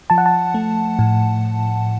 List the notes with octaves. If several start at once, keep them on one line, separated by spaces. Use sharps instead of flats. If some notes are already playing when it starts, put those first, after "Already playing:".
F3 A5
F#5
A5
A3
A2